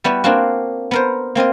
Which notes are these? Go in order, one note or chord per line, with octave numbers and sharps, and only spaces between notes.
G3 B3 E4 F#4
A#3 C4 D4 F4 F#4
B3 A#4 C5
A#3 C4 F4 D#5